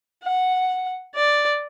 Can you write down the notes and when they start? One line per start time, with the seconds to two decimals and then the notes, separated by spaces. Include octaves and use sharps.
0.24 F#5
1.15 D5